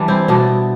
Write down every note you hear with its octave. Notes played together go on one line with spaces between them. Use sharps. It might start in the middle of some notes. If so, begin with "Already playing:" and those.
Already playing: E3 G3 D4
C4 E4
B2 B3 D4